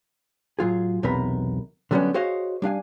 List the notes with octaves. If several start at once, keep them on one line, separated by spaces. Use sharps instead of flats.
A2 F#3 F4 G#4
B1 E2 C3 B3 A#4 B5
D3 F#3 G3 A#3 B3 C#4
F#4 G#4 C5 C#5 D#5 F5
G3 D4 F5 G#5